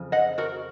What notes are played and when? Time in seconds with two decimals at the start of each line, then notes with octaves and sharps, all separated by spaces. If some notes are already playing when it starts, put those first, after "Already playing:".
Already playing: F2 C#3 F3
0.12 D#5 F#5
0.38 F#4 A#4